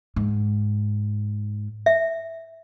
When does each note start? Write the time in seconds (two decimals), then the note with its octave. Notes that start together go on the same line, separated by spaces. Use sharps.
0.16 G#2
1.86 E5